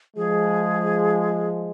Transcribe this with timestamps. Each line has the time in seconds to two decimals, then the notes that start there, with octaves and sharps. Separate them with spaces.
0.17 F3 G#3 G#4